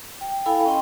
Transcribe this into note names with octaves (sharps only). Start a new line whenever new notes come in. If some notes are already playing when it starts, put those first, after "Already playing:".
G5
E4 A4 F5 G5 G#5 B5
C#4 D#5 G5 C6